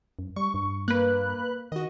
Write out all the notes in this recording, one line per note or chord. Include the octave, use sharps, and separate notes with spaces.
F#2
G3 C#6
G2
A#3 B4 F#6
D#3 F#4 D#5